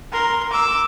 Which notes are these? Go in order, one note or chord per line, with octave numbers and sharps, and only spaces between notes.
A#4 C6
D6 E6